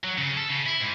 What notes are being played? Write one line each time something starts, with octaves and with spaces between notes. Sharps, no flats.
F#3
C#3
A4
C#3
E4
G#2